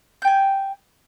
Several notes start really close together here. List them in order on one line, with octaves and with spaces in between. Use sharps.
G6 G5 G#5